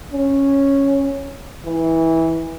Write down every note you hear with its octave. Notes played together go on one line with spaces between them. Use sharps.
C#4
E3